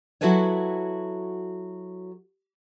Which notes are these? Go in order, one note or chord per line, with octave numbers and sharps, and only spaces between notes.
F#3 E4 F#4 A4 B4 C#5